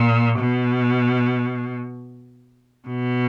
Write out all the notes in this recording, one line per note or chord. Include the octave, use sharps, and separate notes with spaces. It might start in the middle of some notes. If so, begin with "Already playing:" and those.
Already playing: A#2
B2
B2